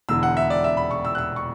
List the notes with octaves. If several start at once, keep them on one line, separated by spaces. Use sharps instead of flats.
E1 E2 D3 E6
F#5
E5
D5
E5
B5
C#6
E6
F#6
E6
C#6